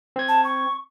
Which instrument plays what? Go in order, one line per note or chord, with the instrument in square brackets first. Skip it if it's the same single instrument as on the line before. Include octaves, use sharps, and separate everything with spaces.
[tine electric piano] C4 G#6
[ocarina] A5
C#6